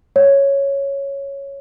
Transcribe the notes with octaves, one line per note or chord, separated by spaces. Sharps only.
C#5